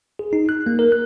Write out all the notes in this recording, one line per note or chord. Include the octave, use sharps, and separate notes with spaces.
G#4
D#4
F#6
A#3
A#4
F#6